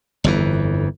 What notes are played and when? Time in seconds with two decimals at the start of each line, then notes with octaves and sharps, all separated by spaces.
0.24 G1 F2 E3